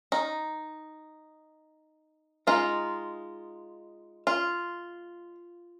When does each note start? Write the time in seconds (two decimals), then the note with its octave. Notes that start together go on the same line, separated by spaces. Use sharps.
0.12 D#4
2.47 G#3 D#4 F4
4.27 F4